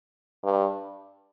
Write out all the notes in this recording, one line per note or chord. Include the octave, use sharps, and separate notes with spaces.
G2